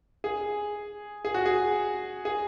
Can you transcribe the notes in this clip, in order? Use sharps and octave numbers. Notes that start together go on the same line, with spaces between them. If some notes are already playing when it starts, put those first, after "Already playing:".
G#4
G#4
F#4
G#4
G#4